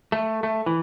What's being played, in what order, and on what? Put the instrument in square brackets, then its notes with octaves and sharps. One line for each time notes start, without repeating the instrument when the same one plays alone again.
[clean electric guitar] A3
A3
E3